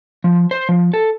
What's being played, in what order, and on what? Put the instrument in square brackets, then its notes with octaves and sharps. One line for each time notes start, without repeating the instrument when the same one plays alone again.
[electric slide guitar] F3
C5
F3
A4